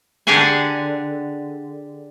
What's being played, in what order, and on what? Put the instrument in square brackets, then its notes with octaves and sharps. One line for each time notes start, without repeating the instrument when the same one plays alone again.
[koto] D3 D4 G4 G#4 F#5 G#5